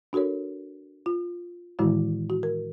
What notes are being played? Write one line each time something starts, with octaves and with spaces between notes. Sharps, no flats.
D4 F#4 A4 A#4 C#5
F4
A2 D#3 E3 G#3 E4 F#4
F#4
A#4